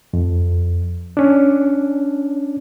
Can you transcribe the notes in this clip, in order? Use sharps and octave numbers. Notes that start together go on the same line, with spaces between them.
F2
C#4 D4